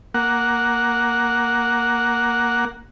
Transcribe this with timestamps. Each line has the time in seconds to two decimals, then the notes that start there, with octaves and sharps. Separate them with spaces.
0.14 A#3 F#5